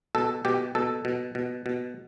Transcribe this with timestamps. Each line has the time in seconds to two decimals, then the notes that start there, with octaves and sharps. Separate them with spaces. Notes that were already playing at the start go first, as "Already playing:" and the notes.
0.15 B2 A4
0.45 B2 G4
0.75 B2 A4
1.05 B2
1.35 B2
1.66 B2